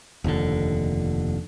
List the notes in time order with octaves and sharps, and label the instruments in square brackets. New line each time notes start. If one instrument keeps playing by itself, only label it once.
[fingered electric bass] F1 D#2 B2 D3